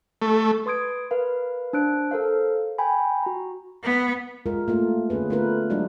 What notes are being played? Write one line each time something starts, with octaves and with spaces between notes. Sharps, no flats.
A3
B4 C6 D#6 G#6 D7
A#4 B4 F5
D4 C5 F#6 D7
A4 A#4 C5 F5
G5 G#5 B5
F#4 A#5
B3
G#3 F4 A#4
A3 A#3 F4
D3 B3 C#4 G#4 B4
A3 B3 C#4 F4 A#4 B4
F#3 G#3 D4 D#4 F#4